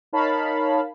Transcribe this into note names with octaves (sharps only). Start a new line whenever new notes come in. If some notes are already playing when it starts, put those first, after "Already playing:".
D#4 A#4 C#5 F5 A5 B5